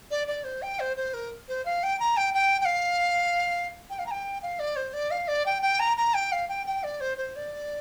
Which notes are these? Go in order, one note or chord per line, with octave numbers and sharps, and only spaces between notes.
D5
D5
C5
G5
C5
C5
A#4
C5
F5
G5
A#5
G5
G5
G5
F5
G5
F5
A#5
G5
F5
D5
C5
D5
F5
D5
G5
G5
A#5
A#5
G5
F5
G5
G5
D5
C5
C5
D5